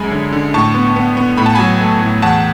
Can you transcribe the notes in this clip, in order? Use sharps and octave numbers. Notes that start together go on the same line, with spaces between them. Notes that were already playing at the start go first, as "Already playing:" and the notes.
Already playing: F#2 G#3 G#5 B5
D3
D3
A2 A5 C#6
B3
B3
B3
A2 B5
A5
F#3 G#5 B5
A3
A2
E2 F#5 A5